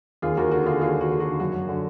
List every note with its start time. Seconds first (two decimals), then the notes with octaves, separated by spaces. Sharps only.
0.22 D#2 F4 G#4
0.37 D#2 F#4 A#4
0.51 D3 F#4
0.66 D3 F4 G#4
0.81 D#2 F4 G#4
0.96 D#2
1.01 F#4
1.10 D3
1.20 F#4
1.25 D3
1.40 F#2 F#4
1.55 F#2
1.69 D3